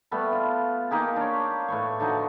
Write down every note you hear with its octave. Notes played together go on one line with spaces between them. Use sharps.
G3 A3 B3 B4
F4
A#3 D#4 G4 G#4
D4 C#5
A2 B4 C#6
D3 F3 D#4 F#4